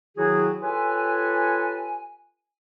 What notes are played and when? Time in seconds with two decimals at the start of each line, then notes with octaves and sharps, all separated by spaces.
0.17 D#3 F#3 E4 F#4 G#4
0.62 F4 G4 A4 B4 C#5 G#5